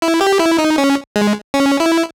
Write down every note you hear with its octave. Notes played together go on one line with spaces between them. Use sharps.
E4
G4
E4
D#4
C#4
G#3
C#4
E4